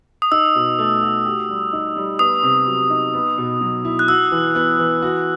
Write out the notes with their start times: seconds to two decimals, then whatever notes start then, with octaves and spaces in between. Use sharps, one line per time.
0.22 D#6
0.31 D#4 E6
0.55 B2
0.79 A3
1.02 F#4
1.26 G4
1.49 G3
1.73 D#4
1.96 G3
2.19 B3 D#6
2.43 C3
2.67 F#3
2.90 D#4
3.14 B3
3.38 B2
3.61 F#3
3.85 E4
3.99 F#6
4.08 F#4 E6
4.32 E3
4.55 B3
4.79 E3
5.03 F#4